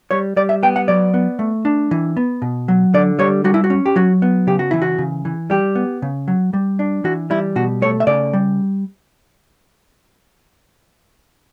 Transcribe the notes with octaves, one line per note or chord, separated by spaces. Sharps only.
G3 C#5
G3 D5
E5
B3 G5
F#5
F#3 D5
B3
A3
D4
E3
B3
B2
F#3
D3 D5
G3 C#5
G3 F#4
E4
F#4
C#4
G4
F#3 F#4
B3
C#3 G4
F#4
E3 E4
F#4
C#3
E3
G3 G4
B3
C#3
F#3
G3
D4
E3 F#4
G3 E4
B2 F#4
A3 C#5
E5
C#3 D5
G3